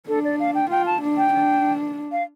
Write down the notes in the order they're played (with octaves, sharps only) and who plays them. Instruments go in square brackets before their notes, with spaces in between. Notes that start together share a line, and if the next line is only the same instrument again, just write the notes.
[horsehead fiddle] D4 [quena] A4
[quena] D5
F5
G5
[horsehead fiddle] F4 [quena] G5
[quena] A5
[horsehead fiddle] D4
[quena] G5
[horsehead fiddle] D4
[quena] F5